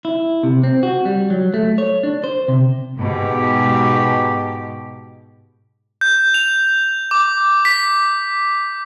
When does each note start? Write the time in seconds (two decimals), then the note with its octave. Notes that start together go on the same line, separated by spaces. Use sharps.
0.05 E4
0.43 C3
0.63 C4
0.83 F#4
1.05 G3
1.30 F#3
1.54 A3
1.78 C#5
2.03 D4
2.24 C5
2.48 C3
2.98 G#2 B2 G4
6.01 G6
6.34 F7
7.11 D6
7.65 B6